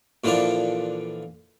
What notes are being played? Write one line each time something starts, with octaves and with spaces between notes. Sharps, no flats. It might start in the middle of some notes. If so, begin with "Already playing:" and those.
A#2 D3 E3 F3 D4